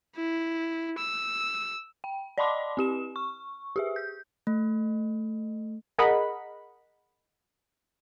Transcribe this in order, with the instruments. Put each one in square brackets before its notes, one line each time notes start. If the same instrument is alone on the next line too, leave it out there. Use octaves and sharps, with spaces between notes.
[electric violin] E4
E6
[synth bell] G5
D5 D#5 A5 B5 C6 D6
C4 G4 E7
C#6
G4 G#4 E5
G6
[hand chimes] A3
[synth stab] G#4 A#4 D#5 F#5 B5